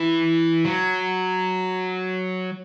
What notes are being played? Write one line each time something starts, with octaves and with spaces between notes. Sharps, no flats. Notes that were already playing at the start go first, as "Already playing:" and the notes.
Already playing: E3
F#3